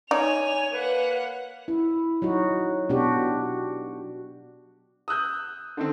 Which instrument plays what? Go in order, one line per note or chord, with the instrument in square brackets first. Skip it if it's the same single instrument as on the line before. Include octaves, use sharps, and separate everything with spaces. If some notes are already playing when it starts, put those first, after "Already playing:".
[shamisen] D#4 D5 [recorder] C#5 [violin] G#5 F7
[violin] A#3 F#5 [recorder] B4
[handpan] E4
F#3 D#4 F#4
B2 D4 F#4 G4
[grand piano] D#6 E6 F#6 G6
D3 D#3 C4